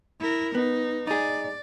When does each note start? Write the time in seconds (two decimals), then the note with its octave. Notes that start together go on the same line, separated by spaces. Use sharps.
0.20 E4 A#4
0.55 B3 D#4
1.07 D#4 G#4 D5